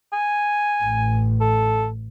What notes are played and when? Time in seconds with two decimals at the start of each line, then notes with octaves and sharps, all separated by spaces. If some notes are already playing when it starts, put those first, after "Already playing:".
0.13 G#5
0.84 A1
1.41 A4